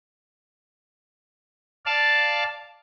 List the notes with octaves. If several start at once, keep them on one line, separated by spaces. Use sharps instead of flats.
D5 F5 A5